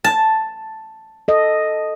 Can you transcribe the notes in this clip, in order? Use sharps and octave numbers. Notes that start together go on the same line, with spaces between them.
A5
A4 D#5